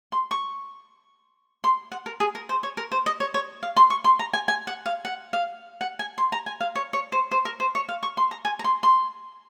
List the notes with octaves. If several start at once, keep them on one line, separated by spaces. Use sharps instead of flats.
C6
C#6
C6
F#5
A#4
G#4
A#4
C5
C#5
A#4
C5
D#5
C#5
C#5
F5
C6
C#6
C6
A#5
G#5
G#5
F#5
F5
F#5
F5
F#5
G#5
C6
A#5
G#5
F5
C#5
C#5
C5
C5
A#4
C5
C#5
F5
C#6
C6
A#5
G#5
A#5
C6
C6